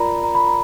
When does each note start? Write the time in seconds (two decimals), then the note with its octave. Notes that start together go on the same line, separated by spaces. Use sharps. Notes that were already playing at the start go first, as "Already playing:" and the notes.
Already playing: F4 A#4 D5 A#5 B5
0.24 A#5
0.35 B5
0.47 A#5